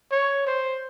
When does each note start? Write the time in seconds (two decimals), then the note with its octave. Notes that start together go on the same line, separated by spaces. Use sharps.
0.12 C#5
0.47 C5